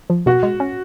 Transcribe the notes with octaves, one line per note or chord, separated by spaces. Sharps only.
F3
B2 F#4
G#3
C#4